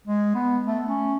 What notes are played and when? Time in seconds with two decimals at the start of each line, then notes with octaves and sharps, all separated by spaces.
0.07 G#3
0.35 B3
0.67 A3
0.86 C#4